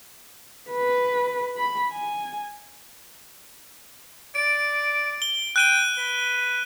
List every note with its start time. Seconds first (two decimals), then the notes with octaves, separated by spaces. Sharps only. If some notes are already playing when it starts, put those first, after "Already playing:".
0.71 B4
1.57 B5
1.92 G#5
4.35 D5 D7
5.22 G7
5.56 G5 F#6 D#7 G7
5.97 B4